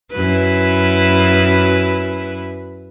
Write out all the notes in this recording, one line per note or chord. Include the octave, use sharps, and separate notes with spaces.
F#2 E4 B4